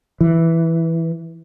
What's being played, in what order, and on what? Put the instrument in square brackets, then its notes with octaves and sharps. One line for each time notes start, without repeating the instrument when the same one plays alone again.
[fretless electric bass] E3